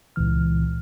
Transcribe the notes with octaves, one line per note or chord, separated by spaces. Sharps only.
C#2 A#2 E3 F6